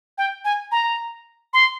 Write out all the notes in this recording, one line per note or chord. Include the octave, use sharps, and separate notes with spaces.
G5
G#5
A#5
C6